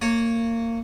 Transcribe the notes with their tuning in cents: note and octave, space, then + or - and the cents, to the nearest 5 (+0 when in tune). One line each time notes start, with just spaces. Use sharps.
A#3 -25 C#5 -5